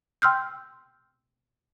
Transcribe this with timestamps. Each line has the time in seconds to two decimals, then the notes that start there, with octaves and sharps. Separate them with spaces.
0.22 G5 C6 E6 F6 G6